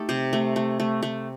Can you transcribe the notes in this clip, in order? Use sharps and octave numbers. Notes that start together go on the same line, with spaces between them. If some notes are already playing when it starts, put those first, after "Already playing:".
Already playing: A3 D#4 G4 A4
C3 C5
A3
A3
A3
A3